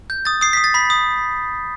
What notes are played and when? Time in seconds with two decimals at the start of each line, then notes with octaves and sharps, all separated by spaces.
0.10 G6
0.25 D#6 A6
0.41 D#6 C7
0.53 D#6 B6
0.64 A6
0.74 B5 B6
0.90 D#6